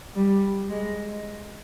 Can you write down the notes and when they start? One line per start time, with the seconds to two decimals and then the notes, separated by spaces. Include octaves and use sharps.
0.16 G3
0.70 G#3